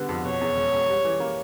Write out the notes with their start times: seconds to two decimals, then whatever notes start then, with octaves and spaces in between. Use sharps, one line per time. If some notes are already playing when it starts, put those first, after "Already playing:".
Already playing: D3 G3 B3
0.09 F2
0.25 B2 C#5
0.41 E2
0.57 E1
0.72 E1
0.89 G3
1.04 E3
1.20 A#3